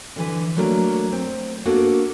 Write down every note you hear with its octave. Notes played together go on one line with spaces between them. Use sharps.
D3 E3 B4
F#3 A3 A#3 D4 A#4
C4
A#3 B3 D4 F#4 A4 A#4